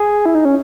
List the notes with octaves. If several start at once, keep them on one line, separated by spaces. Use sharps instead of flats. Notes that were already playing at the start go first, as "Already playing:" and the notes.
Already playing: G#4
E4
D#4
C#4